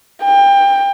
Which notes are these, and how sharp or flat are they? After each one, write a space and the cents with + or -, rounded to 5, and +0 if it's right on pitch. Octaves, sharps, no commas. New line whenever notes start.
G5 +25